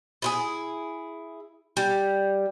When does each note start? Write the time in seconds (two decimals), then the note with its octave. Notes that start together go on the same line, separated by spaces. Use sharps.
0.22 E4 F4 G#4
1.77 G3